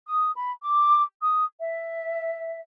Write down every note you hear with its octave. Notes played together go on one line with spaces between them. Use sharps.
D#6
B5
D6
D#6
E5